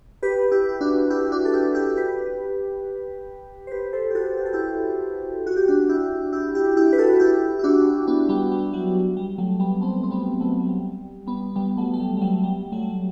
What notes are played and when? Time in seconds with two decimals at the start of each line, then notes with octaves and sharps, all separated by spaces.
0.23 G4 B4
0.52 E4 G4
0.69 E4
0.81 D4 F#4
1.10 E4 G4
1.32 D4 F#4
1.45 A4
1.53 E4 G4
1.75 E4 G4
1.97 G4 B4
3.67 C5
3.71 G4 B4
3.93 A4 C5
4.11 G4
4.15 F#4 A4
4.37 G4
4.46 A4
4.53 E4 G4
5.47 F#4
5.57 G4
5.68 D4 F#4
5.89 E4 G4
6.33 E4 G4
6.55 E4 G4
6.77 E4 G4
6.93 B4
6.98 F#4 A4
7.20 E4 G4
7.59 E4
7.63 D4 F#4
8.07 B3 D4
8.29 G3 B3
8.52 G3
8.73 F#3
9.17 G3
9.28 G3
9.38 F#3 A3
9.60 G3 B3
9.81 A3 C4
10.03 C4
10.11 G3 B3
10.40 F#3 A3
10.60 F#3
10.69 G3
11.27 G3 B3
11.56 G3 B3
11.78 F#3 A3
11.94 A3
12.00 G3
12.17 G3
12.21 F#3 A3
12.44 G3
12.72 F#3 A3